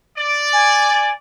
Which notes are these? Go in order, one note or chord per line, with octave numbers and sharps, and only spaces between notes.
D5
G#5